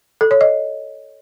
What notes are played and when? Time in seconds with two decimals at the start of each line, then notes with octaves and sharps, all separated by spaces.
0.21 A4
0.31 C#5
0.41 D#5